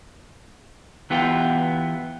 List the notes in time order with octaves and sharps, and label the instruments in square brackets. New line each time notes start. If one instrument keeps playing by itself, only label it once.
[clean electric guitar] E3 B3 F4 G4